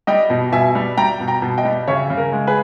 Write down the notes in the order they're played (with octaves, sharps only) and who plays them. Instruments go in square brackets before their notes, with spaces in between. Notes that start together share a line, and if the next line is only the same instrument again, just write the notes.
[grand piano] G3 D#5 G5
B2
B2 E5 G#5
G3
G3 G5 A#5
B2
G5 A#5
B2
D#5 G5
G3
C#3 C#5 E5
C#3
A#4
G#3
G#4 B4